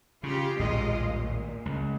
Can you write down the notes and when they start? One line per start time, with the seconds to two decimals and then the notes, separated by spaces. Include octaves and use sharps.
0.23 C#3 F4 G4
0.59 A#1 D#2 A2 G#3 F4 D#5
1.06 A#2
1.66 C#2